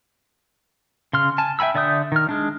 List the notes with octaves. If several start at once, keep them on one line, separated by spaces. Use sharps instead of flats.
C#3 C6 F6
G#5 A5
E5 G5 G#5 B5 E6
D3 D5 E5 D#6 G6
D#3 F6
G#3 D4